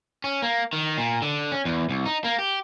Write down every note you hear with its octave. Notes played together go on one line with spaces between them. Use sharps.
C#4
A#3
D#3
A#2
D3
C#4
E2
C2
D#4
A#3
G4